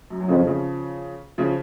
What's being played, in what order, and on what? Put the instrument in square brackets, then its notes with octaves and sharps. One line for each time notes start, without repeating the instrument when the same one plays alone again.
[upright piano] F#2
F#3
[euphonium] F2 [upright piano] C#3 F3
[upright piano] C#3 F3
C#3 F3